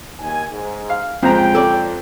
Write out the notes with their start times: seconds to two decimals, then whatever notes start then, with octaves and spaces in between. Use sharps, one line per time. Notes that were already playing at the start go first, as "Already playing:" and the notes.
0.19 D#2 G#5
0.51 G#2
0.90 F5
1.23 F2 C#3 G#3 C4 C5 G5 A#5
1.55 A4 C#5 D5